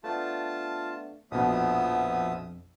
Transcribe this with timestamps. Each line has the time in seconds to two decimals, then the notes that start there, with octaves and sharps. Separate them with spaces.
0.04 A3 B3 D4 F4 A5
1.31 A#1 F2 B2 F3 B3 E5 D#6